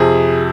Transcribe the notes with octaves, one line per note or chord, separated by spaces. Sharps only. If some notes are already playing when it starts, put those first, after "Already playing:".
Already playing: F2 C3 F3 G#4